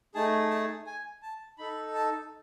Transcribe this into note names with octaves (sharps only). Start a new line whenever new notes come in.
A3 D#4 G#4 A5
A5
G#5
A5
D#4 A4 B5
A5